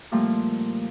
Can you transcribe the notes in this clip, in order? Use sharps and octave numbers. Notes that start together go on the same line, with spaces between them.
A#2 F3 G3 A3 A#3